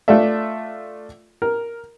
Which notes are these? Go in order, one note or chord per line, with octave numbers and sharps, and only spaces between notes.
A3 D4 F4 A4 D5 E5
A#4